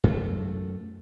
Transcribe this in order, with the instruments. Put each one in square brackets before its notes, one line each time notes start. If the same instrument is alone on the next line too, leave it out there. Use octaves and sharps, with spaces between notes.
[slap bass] F#2 A3